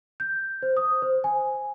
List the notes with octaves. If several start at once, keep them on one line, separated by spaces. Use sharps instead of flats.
G6
C5
D#6
C5
G#5